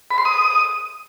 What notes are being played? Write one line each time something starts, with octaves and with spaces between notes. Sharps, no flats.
B5
C6
D#6